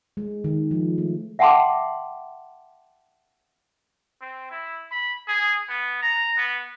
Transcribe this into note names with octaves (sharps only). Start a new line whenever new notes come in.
G#3
D#3
F3
A3
E5 F#5 G5 A5 C6 D6
C4
E4
B5
G#4
B3
A#5
B3